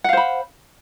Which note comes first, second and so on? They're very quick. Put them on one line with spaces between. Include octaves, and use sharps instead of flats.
F#5 F5 C5 B5